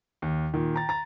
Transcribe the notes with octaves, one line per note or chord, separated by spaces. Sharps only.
D#2
A#2 D#3
G5 A#5 A6
A#5 A6